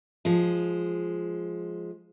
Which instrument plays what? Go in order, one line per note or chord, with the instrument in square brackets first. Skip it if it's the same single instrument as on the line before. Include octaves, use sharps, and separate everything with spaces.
[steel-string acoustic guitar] F3 G#3